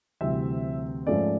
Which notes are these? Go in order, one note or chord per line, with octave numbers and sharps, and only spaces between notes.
D2 C3 E3 G3 C4 E5
G#2 F3 A3 C#4 D5